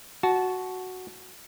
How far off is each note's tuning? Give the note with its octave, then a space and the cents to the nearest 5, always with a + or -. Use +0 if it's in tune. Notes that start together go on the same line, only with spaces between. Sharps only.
F#4 +0 A5 -20